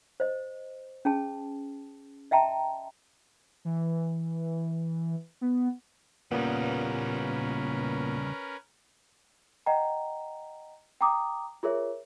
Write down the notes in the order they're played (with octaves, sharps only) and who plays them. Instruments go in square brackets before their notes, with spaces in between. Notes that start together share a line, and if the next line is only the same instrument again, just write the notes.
[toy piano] C5 D#5
C#4 G#4 A5
D#5 E5 G5 A5 A#5 C6
[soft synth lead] E3
B3
[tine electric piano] A#2 A#3 B3 [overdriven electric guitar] C#3 G3 [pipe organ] C#4 A#4 B4
[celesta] D#5 F#5 G5 A#5
G5 A#5 D6 D#6
F4 G#4 A#4 C#5 E5